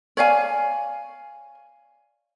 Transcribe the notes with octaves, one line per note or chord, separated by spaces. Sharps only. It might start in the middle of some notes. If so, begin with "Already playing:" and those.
C#5 D5 F5 G#5